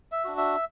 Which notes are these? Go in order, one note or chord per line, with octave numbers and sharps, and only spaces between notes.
E5
D4 F#4
E5